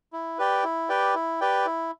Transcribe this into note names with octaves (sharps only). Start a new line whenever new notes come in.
E4
G4 B4 D5 G5
E4
G4 B4 D5 G5
E4
G4 B4 D5 G5
E4